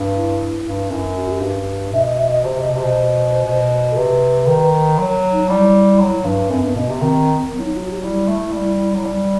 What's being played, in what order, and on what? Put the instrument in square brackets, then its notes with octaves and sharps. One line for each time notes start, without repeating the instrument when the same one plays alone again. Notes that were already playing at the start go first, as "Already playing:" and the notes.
Already playing: [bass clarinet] G2
[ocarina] E4
[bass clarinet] G2
[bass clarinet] F#2 [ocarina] E4
[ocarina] F#4
G4
[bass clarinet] G2
[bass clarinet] B2 [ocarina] E5
[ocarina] D#5
E5
D#5
[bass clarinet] C3 [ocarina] C5
[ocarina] D#5
[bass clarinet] B2
[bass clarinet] C3 [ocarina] C5
[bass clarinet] B2
B2
[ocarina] A4
[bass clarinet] C3 [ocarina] B4
[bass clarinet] D#3
F#3
[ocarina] D#4
[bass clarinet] G3 [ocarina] E4
[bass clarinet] F#3
G2
[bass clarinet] F#2 [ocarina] C4
[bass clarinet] G2 [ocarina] B3
[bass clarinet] B2 [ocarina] B3
[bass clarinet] C3 [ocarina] B3
[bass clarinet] D#3 [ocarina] C4
[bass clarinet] F#3 [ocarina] B3
[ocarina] E4
D#4
F#4
G4
[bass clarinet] G3 [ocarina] E4
[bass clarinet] A3
G3
F#3
G3